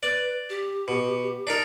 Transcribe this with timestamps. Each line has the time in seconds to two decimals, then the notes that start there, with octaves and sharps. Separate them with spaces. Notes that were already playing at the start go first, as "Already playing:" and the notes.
0.03 B4 D5
0.49 G4
0.88 B2
1.47 D4 D#4 A#4